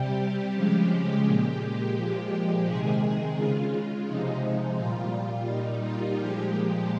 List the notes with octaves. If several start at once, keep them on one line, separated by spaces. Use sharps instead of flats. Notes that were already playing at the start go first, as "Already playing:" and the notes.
Already playing: C3 G3 G4
C#3 F3 G#3
A#2 G#3 G4
A#2 F3 G#3
C3 D#3 G#3 G#4
C#3 G#3 F4
C3 F3 G#3 D#4
A#2 G3 F4
A#2 G3 D#4
F4
A#2 F3 G#3 G4